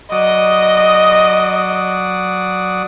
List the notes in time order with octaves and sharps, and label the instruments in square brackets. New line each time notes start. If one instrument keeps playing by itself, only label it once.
[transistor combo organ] F#3 D5 D#6 [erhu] D#5